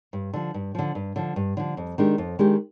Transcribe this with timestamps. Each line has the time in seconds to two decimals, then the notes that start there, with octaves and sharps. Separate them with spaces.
0.13 G2
0.33 D3 F3
0.54 G2
0.75 D3 F3
0.95 G2
1.16 D3 F3
1.36 G2
1.57 D3 F3
1.77 F2
1.98 D#3 G#3 D4 G4
2.18 F2
2.39 D#3 G#3 D4 G4